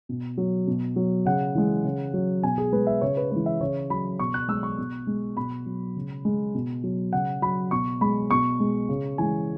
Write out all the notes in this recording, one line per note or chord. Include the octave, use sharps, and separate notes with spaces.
B2
F#3
B2
F#3
C#3 F#5
E3 G#3
C#3
F#3
B2 G#5
G#4
G#3 B4
E5
C#3 C#5
B4
E3 G#3 B4
E5
C#3 C#5
F#3 B5
B2 C#6
F#6
G#3 E6
C#6
B2
G#3
B2 B5
F#3
C#3
G#3
B2
F#3
C#3 F#5
F#3 B5
B2 C#6
G#3 B5
B2 C#6
G#3
C#3
E3 G#3 G#5